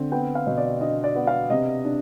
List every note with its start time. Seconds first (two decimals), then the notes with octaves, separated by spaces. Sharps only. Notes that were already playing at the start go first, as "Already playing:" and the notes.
Already playing: D3 C4
0.12 B3 G5
0.35 F5
0.47 B2
0.58 D5
0.81 D4 D#5
1.04 D5
1.15 B3
1.27 F5
1.50 C3 D#5
1.85 D4